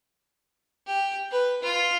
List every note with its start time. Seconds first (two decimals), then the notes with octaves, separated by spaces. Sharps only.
0.87 G4
1.31 B4
1.63 F4